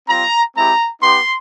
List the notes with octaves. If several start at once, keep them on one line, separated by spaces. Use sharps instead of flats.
G3 C4 F4 A#5
G#3 C4 E4 G4 A#5
B3 D#4 G4 C6